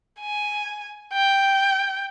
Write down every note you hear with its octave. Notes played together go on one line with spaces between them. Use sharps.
G#5
G5